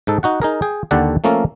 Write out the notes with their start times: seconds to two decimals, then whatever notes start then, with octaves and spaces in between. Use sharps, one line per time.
0.07 G#2 D#4 A4
0.23 D#4 F#4 F#5
0.42 D#4 G#4 A#4
0.62 G#4 G5
0.91 D#2 D3 G4 A4 D5 F#5
1.24 F3 A3 A#3 C#4 A4 A#4